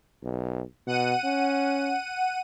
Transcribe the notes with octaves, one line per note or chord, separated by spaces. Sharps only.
B1
B2 F#5 D#7
C#4